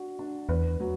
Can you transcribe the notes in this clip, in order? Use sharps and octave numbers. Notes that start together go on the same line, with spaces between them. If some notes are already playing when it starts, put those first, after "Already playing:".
Already playing: D4 F#4
D4
E2 B4
F#3